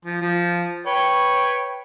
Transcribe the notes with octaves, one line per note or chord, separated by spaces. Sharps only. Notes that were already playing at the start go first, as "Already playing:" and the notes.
F3
F3
B4 C#5 G5